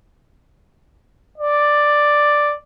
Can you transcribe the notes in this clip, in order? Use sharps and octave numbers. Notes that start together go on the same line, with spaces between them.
D5